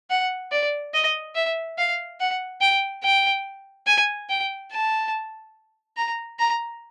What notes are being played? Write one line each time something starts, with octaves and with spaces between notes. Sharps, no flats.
F#5
D5
D#5
E5
F5
F#5
G5
G5
G#5
G5
A5
A#5
A#5